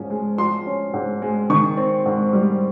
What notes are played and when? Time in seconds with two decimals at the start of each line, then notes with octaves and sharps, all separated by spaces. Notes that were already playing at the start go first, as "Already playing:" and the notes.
Already playing: G#2 F3 C#4
0.10 G#3
0.38 F3 C6
0.66 C#4
0.93 G#2
1.22 G#3
1.50 D#3 C#6
1.77 C4
2.05 G#2
2.33 G3